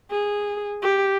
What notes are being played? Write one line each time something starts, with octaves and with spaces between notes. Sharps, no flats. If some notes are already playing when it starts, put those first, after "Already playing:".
G#4
G4